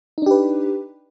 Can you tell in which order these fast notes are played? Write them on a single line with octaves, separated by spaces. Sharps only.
D#4 D4 G4 B4